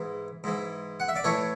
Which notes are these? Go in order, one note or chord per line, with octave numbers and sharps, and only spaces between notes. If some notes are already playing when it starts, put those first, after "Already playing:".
Already playing: G#2 E3
G#2 E3
F#5
E5
D5
A2 E3 A4 C#5